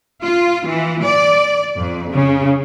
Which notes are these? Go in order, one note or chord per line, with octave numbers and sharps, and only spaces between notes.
F4
E3
D5
F2
C#3